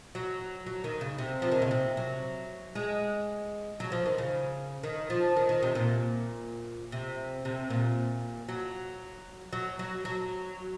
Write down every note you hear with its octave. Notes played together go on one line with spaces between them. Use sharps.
F#3
F#3
D#3
C#3
C3
F3
D#3
C#3
C3
F#3
G#3
F#3
F3
D#3
C#3
D#3
F3
D#3
D#3
C3
A#2
C3
C3
A#2
F#3
F#3
F#3
F#3